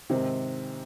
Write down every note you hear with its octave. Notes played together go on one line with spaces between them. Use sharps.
G#2 C3 D#3 C4